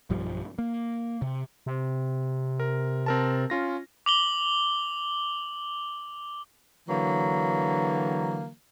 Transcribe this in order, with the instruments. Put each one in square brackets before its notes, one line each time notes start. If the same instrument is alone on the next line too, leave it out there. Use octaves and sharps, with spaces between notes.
[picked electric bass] B1 G2 F3 G3
A#3
C3
[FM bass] C3
[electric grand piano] A#4
C4 A#4 A5
C#4 F4 A#6
[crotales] D6 F#7 G7
[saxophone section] D3 E3 F#3 A#3